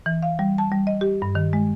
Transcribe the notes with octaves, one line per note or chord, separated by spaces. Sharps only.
E3
F5
G3
A5
G3
D#5
G4
G2
D#3
G#3